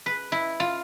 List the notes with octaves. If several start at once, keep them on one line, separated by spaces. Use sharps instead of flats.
B4
E4
F4